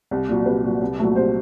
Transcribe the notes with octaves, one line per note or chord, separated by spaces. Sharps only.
C2
A#2 F#3
C2 B4
A#2 F#3
C2
A#2 F#3 A3
C2 C5